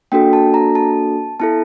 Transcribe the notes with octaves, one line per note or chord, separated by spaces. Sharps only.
A#3 D4 F#4 A4 G5
A5
A#5
A5
B3 E4 A4 A5